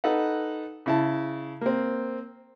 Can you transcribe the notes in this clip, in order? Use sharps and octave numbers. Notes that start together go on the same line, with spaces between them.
D#4 A4 B4 F#5
C#3 E4 A5
A#3 C4